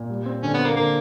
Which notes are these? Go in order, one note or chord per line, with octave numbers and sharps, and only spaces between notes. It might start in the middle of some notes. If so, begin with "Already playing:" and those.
Already playing: A#2
G3
C4
D3 C#4
B3
C4
A#3
D3 A#3